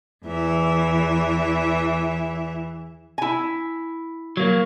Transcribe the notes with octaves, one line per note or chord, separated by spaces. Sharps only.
E2 E3 E5
E4 G#5
F#3 A#3